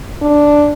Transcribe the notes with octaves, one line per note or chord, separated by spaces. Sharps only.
D4